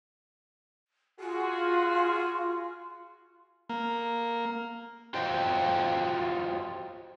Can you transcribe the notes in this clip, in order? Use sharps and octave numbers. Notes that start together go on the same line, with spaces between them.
F4 F#4 G#4
A#3
F4 F#4 C5 D#5 F5 G5